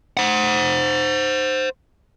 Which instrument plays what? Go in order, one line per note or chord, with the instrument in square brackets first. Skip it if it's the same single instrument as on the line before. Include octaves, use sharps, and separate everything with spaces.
[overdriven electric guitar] C5 F#5